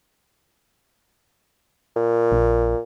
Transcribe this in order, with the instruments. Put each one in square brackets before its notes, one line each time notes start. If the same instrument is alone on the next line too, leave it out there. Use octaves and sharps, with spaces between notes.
[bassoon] A#2
[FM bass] A#1